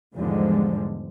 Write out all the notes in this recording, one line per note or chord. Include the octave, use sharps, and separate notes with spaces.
E2 G#2 D3 F3 G3 G#3